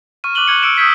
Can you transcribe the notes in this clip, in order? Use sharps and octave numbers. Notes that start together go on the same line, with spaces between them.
C#6 F6 D#7
C#6 D6 F#6 D#7 F#7 G7
C#6 F#6 G#6 C#7
E6 F6 C#7 D7 E7
D#6 E6 G6 G#6 B6 E7